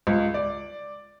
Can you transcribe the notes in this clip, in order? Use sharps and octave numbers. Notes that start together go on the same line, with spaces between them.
C#2
D5